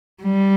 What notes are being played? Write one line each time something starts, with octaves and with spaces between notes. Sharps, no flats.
G3